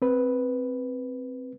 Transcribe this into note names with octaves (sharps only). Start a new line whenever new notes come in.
C4 B4